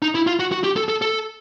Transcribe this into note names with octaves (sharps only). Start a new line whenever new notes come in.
D#4
E4
F4
F#4
F#4
G4
A4
A4
A4